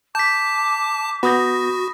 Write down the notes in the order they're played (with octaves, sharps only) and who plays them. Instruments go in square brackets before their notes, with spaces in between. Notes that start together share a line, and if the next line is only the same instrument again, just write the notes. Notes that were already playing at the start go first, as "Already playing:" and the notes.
[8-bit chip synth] A5 [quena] D6 [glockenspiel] G6 B6
[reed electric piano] B3 G6 [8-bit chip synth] F#4 [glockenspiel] B5 D#6 A#6